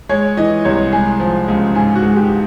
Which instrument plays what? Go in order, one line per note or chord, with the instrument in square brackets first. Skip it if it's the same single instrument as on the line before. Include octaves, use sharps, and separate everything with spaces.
[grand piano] G#3 C#5
E3 D#5
C2 C#5
G#3 G#4
F3
C#2
G#2 G#4
F#4
G#3
G4